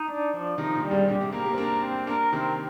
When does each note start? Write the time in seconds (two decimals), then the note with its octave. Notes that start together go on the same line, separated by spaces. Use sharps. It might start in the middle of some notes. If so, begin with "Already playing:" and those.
Already playing: D#4
0.08 D4
0.34 F3
0.58 C3 D#3 D#4
0.75 A#2 D3
0.83 G3
0.91 G#2 C3
1.08 A#2 D3 G4
1.20 G#2 C3
1.32 G3 A#3 A#4
1.46 G3 A#3
1.53 C4
1.58 A#3 D4 A#4
1.83 C4
2.07 A#3 D4 A#4
2.33 C3 D#3 C4